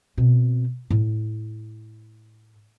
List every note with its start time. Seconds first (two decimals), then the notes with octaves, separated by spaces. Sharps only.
0.18 B2 C4
0.90 A2